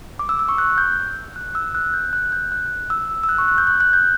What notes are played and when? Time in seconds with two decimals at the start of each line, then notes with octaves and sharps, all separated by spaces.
0.19 D6
0.29 E6
0.39 E6
0.49 C#6
0.58 F#6
0.78 G6
1.36 F#6
1.55 E6
1.75 F#6
1.94 G6
2.13 F#6
2.32 G6
2.52 F#6
2.90 E6
3.23 E6
3.29 F#6
3.38 C#6
3.48 F#6
3.58 G6
3.67 F#6
3.80 F#6
3.93 G6